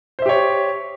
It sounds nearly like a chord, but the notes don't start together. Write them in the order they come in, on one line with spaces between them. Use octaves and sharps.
C5 E5 G4 C#5